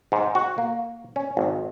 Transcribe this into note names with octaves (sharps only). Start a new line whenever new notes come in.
G#2
F#4
A#3
C#4
G#1